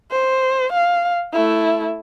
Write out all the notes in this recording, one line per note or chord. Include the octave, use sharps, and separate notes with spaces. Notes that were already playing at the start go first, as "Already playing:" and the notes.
C5
F5
A3 E4